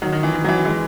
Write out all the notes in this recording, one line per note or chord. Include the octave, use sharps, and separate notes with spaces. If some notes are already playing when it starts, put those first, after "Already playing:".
D#3 F#3
D#3
E3
D#3
F#3
E3
E3 G#3